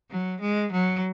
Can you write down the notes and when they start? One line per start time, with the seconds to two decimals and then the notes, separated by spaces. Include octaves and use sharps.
0.10 F#3
0.41 G#3
0.72 F#3